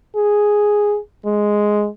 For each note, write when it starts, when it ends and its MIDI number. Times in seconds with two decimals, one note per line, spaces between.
0.16 0.98 68
1.25 1.87 56